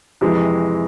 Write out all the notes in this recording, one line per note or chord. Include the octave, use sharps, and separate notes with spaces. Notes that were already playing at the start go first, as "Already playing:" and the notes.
F2 C3 E3 G#3